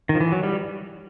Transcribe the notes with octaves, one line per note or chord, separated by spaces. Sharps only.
D#3
F3
E3
F#3
G3